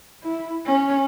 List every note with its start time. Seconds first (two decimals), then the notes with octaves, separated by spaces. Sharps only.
0.23 E4
0.66 C#4